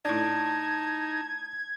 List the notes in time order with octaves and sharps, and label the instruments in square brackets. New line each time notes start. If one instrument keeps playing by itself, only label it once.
[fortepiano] A2 D4 [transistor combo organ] D#4 [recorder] A5 [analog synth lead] G#6